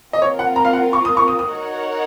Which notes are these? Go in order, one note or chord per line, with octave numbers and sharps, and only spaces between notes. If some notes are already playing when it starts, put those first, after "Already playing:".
C4 F4 A#4 D#5
C#5
F#5
A#5
F5
F#5
C#6
D#6
C#6
D#6
D#6
D#4 F#4 A#4 C#5 F#5